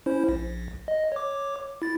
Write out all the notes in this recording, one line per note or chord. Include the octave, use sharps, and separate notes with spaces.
C#4 E4 C5
A#1
D#5
C#5 D6
E4 A6